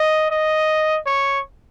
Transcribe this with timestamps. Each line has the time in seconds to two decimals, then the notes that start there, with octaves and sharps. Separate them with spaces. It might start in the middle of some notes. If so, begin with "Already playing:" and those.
Already playing: D#5
0.30 D#5
1.06 C#5